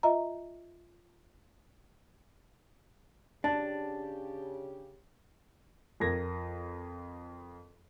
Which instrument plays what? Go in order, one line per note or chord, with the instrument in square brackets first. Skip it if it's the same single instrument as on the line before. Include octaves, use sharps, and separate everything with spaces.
[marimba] F4 D#5 E5 A#5
[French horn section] C#3 G4 [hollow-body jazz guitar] D4 [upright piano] A5
[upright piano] F2 A#4 G#6 A#6